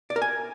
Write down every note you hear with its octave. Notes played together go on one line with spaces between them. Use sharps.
D5
A#4
G#5